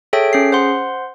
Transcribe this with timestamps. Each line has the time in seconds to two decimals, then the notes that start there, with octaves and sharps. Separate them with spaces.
0.13 G#4 A4 C#5 E5 G5 D7
0.33 C#4 G#4 C7
0.52 C5 F#5 C6